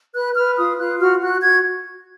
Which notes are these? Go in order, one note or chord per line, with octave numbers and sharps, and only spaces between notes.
B4 F#6
B4 F6
F4 D#6
F4 F#6
F#4 F6
F#4 F#6
F#4 G#6